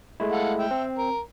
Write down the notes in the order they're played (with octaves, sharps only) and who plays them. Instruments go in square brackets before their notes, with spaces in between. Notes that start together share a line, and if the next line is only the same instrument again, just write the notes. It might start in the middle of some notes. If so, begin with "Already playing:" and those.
[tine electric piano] G#3 A3 E4
[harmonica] A4 F5 F#5
E5 G5
[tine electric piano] C4
[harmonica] A#4